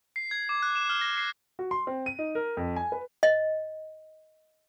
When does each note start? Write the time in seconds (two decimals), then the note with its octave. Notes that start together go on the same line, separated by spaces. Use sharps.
0.16 C7
0.31 G#6
0.49 D6
0.63 F#6
0.76 E7
0.89 F6
1.01 A#6
1.17 C7
1.59 F#4
1.71 C6
1.87 C4
2.06 D#7
2.19 D#4
2.35 A#4
2.57 F2
2.76 G#5
2.92 B4
3.23 D#5